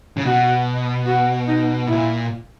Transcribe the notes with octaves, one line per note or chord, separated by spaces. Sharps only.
C#3
B2 F#4
F#4
D#4
A#2 E4